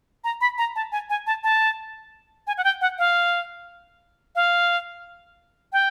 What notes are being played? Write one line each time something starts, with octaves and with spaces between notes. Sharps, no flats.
A#5
B5
A#5
A5
G#5
G#5
A5
A5
G#5
F#5
G5
F#5
F5
F5
G5